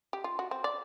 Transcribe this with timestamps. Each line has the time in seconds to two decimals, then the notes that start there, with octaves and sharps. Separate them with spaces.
0.13 G4
0.24 F4
0.39 F#4
0.51 C4
0.64 D5